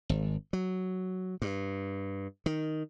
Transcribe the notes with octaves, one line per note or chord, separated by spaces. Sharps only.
G#1
F#3
G2
D#3